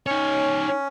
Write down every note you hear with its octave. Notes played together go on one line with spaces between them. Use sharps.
C#4 D#4 C#5